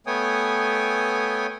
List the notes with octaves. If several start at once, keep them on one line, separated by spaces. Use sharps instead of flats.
A3 B3 C#5 G5 G#5 D#6